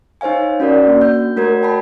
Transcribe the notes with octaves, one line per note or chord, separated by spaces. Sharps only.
D#4 C5 C#5 F5 G#5
C#4 F#4 A#4 D5
A#3 D4 F#4
G6
A3 F#4 A#4 C#5 G#6
G5 A5 B5